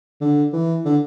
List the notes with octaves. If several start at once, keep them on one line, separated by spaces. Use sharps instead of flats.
D3
E3
D3